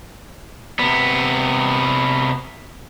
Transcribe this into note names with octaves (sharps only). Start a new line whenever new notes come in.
C3 B3